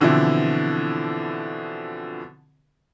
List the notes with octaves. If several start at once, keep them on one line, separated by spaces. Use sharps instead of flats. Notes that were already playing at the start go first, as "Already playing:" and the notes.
B2 D3 E3 F3 C4 E4